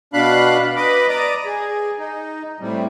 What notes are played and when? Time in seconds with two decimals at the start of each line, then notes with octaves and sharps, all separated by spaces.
0.14 B2 D4 F5 B5 F#6
0.77 B4 D#5 B5 D6
1.09 D5 A#5 D6 D#6
1.45 G#4
1.99 D#4
2.60 A2 C3 G3